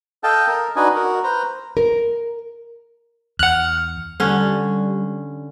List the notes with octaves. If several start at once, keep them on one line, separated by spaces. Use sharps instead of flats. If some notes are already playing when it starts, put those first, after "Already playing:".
A4 D#5 F5 G5 A5
A#4
D4 D#4 F#4 B4 D#5 G#5
F#4 A#4
B4 C5 A#5
A#4
E2 F#5 F6 F#6
D3 G3 C#4